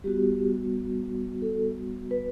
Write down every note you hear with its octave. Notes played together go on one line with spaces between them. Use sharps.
G3 B3 F#4 G4
A4
B4